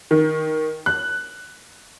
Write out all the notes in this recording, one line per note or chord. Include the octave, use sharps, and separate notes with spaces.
D#3
F#6